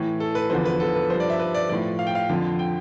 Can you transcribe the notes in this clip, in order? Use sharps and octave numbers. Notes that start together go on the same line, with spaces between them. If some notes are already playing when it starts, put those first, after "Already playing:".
Already playing: A2 E3
A4
B4
E2 D3 F3 C5
B4
A4
B4
G2 F3 C5
D5
E5
B4
D5
A2 F3 D5
F5
G5
F5
F2 D3 F3
G5